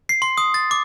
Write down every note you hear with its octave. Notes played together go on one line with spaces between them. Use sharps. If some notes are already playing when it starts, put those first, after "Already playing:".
C7
C6
D#6
A6
D6